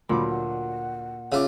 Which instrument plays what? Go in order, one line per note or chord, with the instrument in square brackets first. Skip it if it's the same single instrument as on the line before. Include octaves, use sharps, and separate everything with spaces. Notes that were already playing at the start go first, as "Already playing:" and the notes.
[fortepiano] D2 F#3 D6 [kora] A#2 [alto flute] B5
[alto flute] F#5
[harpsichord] C#3 F4 [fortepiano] E5 D6